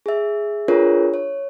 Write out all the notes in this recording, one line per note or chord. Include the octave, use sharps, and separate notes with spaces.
G#4 E5
D4 F4 G#4 A#4 B4 C#5
C#5